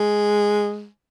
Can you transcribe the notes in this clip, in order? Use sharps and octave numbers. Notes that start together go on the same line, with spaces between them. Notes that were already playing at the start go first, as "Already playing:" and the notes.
Already playing: G#3